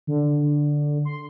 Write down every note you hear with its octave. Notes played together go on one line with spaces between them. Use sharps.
D3
C6